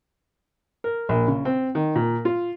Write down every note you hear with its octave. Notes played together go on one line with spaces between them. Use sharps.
A#4
A#1
C#3
C4
D#3
A#2
F4